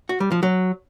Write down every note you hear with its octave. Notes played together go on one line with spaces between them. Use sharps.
F#4
G3
F3
F#3